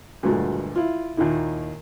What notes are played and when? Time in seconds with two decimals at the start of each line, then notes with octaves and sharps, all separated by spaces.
0.23 D2 G2 A#2 F#3 G#3 A3
0.76 E4 F4
1.17 D#2 A#2 D#3 D#4 E4